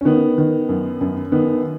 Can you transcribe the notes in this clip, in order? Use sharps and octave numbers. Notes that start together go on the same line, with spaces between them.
C#4
D#3 B3
D#3
F#2
F#2
D#3 B3